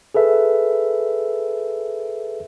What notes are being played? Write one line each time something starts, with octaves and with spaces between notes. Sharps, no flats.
G#4 A4 B4 E5